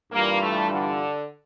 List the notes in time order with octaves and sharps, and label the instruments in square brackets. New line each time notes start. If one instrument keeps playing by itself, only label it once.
[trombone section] G2 E3 G3 D4 F4 [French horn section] A#3
[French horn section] A3
D3